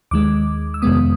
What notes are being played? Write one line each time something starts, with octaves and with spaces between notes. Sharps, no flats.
D#2 D#3 G#3 D6
E6
F2 C3 D#3 G#3 B3 D#6